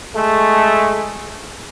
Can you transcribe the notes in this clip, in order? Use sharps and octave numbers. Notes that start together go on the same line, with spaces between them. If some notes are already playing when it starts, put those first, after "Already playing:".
G#3 A3